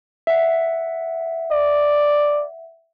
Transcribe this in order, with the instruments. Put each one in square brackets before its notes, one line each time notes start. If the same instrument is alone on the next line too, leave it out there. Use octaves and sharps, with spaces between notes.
[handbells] E5 F#5
[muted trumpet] D5